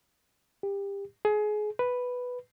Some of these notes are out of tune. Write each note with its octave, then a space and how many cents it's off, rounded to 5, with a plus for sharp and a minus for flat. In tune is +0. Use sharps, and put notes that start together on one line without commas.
G4 +25
G#4 +25
B4 +0